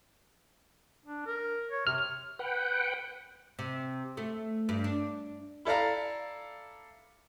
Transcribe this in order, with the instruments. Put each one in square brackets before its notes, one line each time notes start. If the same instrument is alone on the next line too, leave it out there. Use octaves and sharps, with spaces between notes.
[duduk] D4
A#4
C#5
[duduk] C3 [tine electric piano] F6
[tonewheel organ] B4 F#5 G5
[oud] C3
A3
G2
D4
[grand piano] E4 A4 D5 F5 A#5